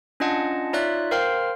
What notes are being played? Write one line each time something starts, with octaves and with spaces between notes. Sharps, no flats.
C#4 D4 F4 D#5 F#5 A5
D#4 F4 C#5 D5 E5 F#6
A#4 C5 F5 G5 C6 F6